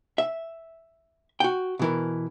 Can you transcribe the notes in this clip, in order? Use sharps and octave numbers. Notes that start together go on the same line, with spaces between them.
E5
F#4 G5
B2 E3 A#4